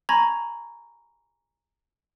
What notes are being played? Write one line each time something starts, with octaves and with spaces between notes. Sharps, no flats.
G#5 A#5 B5 C#6 G#6 A#6